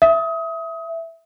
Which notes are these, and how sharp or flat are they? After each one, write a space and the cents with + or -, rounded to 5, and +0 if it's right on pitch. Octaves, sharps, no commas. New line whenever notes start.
E5 +0 D#6 +25